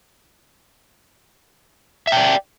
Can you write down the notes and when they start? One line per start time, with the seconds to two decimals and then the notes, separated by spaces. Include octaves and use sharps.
2.07 E5
2.12 G5
2.17 D5